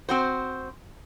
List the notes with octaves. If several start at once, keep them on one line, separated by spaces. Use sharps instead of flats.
C4 F#4 C5